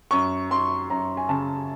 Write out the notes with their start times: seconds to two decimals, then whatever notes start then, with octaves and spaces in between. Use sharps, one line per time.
0.11 F#2 C#6
0.50 F#2 C6
0.90 F#2 A#5
1.17 G#5
1.29 C#3 A5